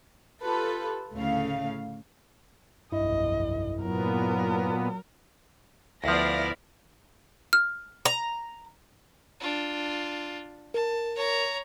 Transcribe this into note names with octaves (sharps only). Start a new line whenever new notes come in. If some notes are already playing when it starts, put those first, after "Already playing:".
F4 G4 A4 B4
D2 A2 C#3 A3 F5
F1 B1 G2 E4 D#5
A#2 F#3 B3 A#4
D2 F3 B3 E4 D5 F5 A#6
F6
A#5
D4 F4
A#4 A5
C#5 A#5